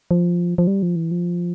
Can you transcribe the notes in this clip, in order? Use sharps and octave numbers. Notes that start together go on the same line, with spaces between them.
F3
F3
G3
F3
E3
F3